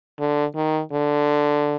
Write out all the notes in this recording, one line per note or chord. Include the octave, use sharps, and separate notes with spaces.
D3
D#3
D3